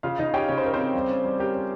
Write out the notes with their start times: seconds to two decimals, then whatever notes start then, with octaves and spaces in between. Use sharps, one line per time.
0.03 C#3 F4 F5
0.18 C#3 D#4 D#5
0.34 C#4 G4 G5
0.48 C#3 C#5
0.58 C5
0.64 C#4 A#4
0.74 C4 C5
0.80 C#3
0.95 G3
1.09 C#4
1.24 G3
1.40 G4 A#4
1.55 C#4